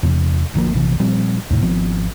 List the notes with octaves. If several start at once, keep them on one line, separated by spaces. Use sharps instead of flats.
E2 C3
D1 G1 F3 A#3
A#1 C3 E3
A#2 F3 G3 C4
D#2 A2 C3
G#1 F3 B3 C4